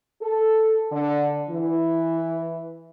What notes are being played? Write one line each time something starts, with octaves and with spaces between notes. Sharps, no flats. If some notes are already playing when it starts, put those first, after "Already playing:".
A4
D3
E3